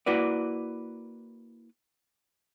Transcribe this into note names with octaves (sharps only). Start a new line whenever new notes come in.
A#3 E4 F#4 B4 D5